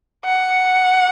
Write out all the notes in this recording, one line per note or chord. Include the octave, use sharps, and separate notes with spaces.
F#5